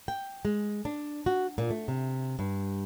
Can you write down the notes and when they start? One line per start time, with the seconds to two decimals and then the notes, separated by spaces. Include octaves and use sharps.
0.08 G5
0.45 G#3
0.85 D4
1.26 F#4
1.58 A#2
1.70 A3
1.88 C3
2.39 G2